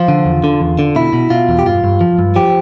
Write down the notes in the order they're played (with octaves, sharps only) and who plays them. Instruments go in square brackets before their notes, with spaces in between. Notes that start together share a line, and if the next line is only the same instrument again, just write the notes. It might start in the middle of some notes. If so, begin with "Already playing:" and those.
Already playing: [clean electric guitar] F3 F4
D3
E2
D3
E2
D3
B2 E4
B2
B2 F4
E2
G4
G2 F4
G2
F3
G2
F3 G4